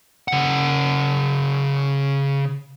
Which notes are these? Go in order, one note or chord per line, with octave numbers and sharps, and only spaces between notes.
C#3 F#5